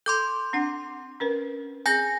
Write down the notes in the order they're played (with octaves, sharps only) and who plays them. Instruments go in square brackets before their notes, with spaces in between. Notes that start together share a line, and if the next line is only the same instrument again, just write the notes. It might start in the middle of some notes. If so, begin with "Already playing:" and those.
[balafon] A4 [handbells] C6 D6 G6
[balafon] C4 D4 F#5
C#4 A#4 B4
[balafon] C4 G#4 [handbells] G#5 G6 A#6